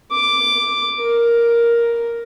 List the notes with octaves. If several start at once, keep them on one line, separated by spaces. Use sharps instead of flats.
D6
A#4